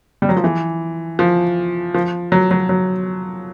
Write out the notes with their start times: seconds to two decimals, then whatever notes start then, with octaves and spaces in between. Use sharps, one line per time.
0.22 G3
0.29 F#3
0.37 F3
0.44 E3
1.19 F3
1.95 F3
2.32 F#3
2.51 F#3
2.69 F#3